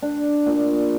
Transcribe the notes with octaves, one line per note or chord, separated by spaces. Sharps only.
D4
A#2